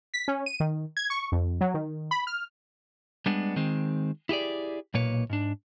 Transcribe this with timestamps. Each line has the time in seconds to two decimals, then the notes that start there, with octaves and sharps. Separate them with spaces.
0.14 B6
0.28 C#4
0.46 D#7
0.60 D#3
0.97 G#6
1.10 C#6
1.32 F2
1.61 F#3
1.74 D#3
2.11 B5
2.27 F6
3.26 G3 G#3 B3 D4
3.56 D#3 G#3 C4
4.29 E4 G4 G#4 D5
4.94 B1 A#2 A#3 B4 C#5
5.30 G#2 D4